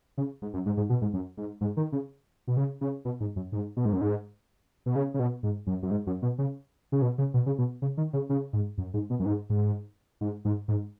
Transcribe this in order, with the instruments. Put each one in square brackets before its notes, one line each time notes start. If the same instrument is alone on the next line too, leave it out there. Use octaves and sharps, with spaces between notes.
[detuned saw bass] C#3
G#2
F#2
G#2
G#2
B2
G#2
F#2
G#2
G#2
D#3
C#3
B2
C#3
C#3
B2
G#2
F#2
G#2
B2
G#2
F#2
G#2
B2
C#3
C#3
B2
G#2
F#2
F#2
G#2
F#2
B2
C#3
C#3
B2
C#3
B2
C#3
B2
C#3
D#3
C#3
C#3
G#2
F#2
G#2
B2
F#2
G#2
G#2
G#2
G#2
G#2